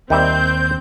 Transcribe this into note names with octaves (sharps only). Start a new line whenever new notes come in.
D#2 D#3 G3 C4 E5 G6